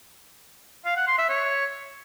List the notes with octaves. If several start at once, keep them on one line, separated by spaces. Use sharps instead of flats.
F5
F#5
C6
E5
C#5